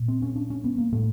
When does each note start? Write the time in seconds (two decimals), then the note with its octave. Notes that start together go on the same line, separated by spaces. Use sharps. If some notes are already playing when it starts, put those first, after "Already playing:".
Already playing: A#2
0.08 C4
0.22 C#4
0.36 D4
0.50 C#4
0.64 B3
0.78 A#3
0.92 A2 A3